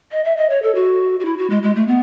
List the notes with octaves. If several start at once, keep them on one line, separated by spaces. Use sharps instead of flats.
D#5
E5
D#5
C#5
A4
F#4
F#4
E4
F#4
G#3
G#3
A3
B3